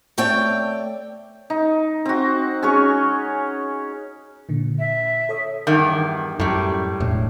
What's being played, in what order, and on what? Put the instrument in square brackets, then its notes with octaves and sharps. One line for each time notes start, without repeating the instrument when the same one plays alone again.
[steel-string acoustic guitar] A3 C4 C#5 D5 G5
[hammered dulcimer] D#4
C4 F#4
C#4 G#4 C#5 C#6
[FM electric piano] A#2 D3
[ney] E5
[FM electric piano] A4 C#5 D#6
[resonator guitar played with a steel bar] E2 G2 D#3
[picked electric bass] F#2 [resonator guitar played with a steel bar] A2 G3
[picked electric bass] E1 A2